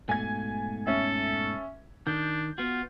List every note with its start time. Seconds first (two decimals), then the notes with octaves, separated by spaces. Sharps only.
0.09 G#2 B2 A3 G#5 G#6
0.87 C#4 A4 E5
2.07 D#3 D4 G6
2.58 B3 F4 F#4